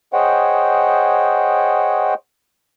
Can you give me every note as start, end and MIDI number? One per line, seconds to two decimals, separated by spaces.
0.13 2.14 68
0.13 2.14 72
0.13 2.14 73
0.13 2.14 75
0.13 2.14 78
0.13 2.14 79